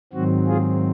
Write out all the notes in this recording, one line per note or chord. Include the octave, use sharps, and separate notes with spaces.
G#2 D#3 F#3 C4 F#4
F4 G#4